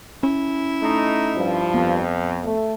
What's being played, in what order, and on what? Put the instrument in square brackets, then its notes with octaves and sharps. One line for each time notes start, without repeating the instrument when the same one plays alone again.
[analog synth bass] C#4 [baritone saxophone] E4
[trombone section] A3 D#4
[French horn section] G2 F3
[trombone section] F2 [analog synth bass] B3
[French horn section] A3